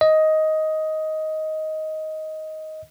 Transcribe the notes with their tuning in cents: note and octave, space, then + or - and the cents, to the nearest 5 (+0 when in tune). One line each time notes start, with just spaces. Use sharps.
D#5 +10